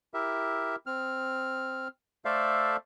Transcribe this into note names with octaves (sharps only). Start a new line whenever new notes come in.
E4 G4 A#4 E5
C4 F6
A3 A4 C5 D5 E5 F5